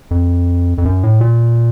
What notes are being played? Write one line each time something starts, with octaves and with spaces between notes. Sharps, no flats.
F2
F2
F#2
A2
A#2